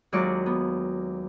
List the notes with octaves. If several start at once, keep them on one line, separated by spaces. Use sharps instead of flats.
D#2 F#3 G#3 F4 D5 C#6
B3